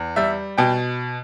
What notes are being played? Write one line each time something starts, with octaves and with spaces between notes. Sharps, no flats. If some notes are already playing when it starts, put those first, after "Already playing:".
Already playing: E2
G3 E5
B2 G5